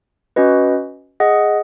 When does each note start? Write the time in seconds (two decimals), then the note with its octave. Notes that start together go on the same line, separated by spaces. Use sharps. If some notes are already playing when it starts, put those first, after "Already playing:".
0.36 C#4 F#4 B4 D#5
1.20 G#4 D#5 F#5